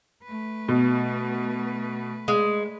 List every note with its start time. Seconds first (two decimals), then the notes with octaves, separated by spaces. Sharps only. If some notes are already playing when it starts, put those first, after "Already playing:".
0.24 A3 B4
0.68 B2
2.28 G#3